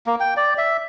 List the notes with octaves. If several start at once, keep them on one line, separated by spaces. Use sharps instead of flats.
A#3
G5
D5
E5